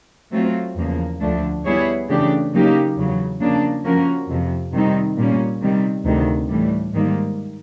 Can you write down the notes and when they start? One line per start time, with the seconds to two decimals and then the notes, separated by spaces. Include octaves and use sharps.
0.33 F#3 A3 C4 F4
0.76 E2 C#3 F3 A#3
1.21 D2 D3 F3 A3 D4
1.65 G3 B3 E4 G#4 C#5
2.08 C#3 E3 A3 D4 G4
2.52 C#3 F#3 A#3 D#4 G4
2.96 E2 C#3 F#3
3.41 C#3 F3 A#3 D4
3.84 F3 A#3 C#4 F#4 A#4
4.29 F2 C3 F3
4.73 C3 D#3 G3 C4 D#4
5.17 A#2 G3 A#3 C#4
5.60 C3 D#3 G3
6.05 D2 C3 D#3
6.49 A2 E3 G3
6.93 G#2 D#3 G3 A#3